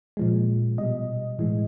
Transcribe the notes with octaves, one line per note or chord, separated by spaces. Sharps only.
A#2 F3 G#3
B2 G3 D#5
A2 E3 G#3